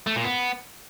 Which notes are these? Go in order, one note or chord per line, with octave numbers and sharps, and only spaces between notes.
A3
A#2
B3